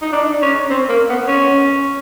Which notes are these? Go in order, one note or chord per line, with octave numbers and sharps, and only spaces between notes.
D#4
D4
C#4
C4
A#3
B3
C#4